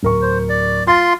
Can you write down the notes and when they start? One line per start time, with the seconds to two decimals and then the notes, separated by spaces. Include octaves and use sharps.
0.03 D1 A#4 C#6
0.22 C5
0.49 D5
0.87 F4 C6 A6